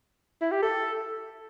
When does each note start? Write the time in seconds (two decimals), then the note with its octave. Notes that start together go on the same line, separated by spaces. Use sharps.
0.41 E4
0.52 G4
0.63 A4